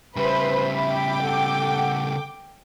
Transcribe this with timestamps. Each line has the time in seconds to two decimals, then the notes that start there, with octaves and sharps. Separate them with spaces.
0.17 C#3 G3 B4 C5 E5 B5
0.77 G5 D6
1.22 A4 F#5